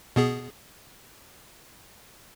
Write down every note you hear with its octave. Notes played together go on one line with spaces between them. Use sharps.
B2 B3 G#4